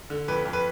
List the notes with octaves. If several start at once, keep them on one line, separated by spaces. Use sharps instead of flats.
D3
F2 B4
F2
B4